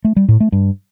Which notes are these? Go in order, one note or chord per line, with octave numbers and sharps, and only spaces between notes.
A3
G3
A2
A3
G2